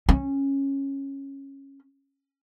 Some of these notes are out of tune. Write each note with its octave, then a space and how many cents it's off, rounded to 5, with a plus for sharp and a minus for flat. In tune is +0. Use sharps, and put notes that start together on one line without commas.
C#4 -10